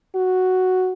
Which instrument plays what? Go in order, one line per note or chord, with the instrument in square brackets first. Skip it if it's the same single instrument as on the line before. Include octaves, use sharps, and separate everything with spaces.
[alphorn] F#4